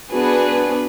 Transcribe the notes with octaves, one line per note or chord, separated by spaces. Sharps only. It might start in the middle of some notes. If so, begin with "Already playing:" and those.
B3 D4 F#4 G#4 B4